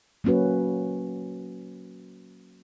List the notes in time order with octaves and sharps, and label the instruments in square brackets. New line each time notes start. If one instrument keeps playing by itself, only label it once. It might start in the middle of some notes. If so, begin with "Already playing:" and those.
[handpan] F#3 A#3 C#4 F#4 B4